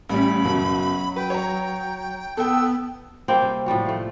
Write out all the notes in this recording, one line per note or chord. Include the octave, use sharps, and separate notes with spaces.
A1 G3 C#4 B5
F#1 B2 F#3
B4 G5
C#5 A#5
B3 A4 G5 E6
G3 A#3 C4
C3
A2 F3 G3 F#4
F3 A3